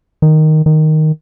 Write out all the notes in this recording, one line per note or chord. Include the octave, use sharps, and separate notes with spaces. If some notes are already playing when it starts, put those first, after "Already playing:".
D#3
D#3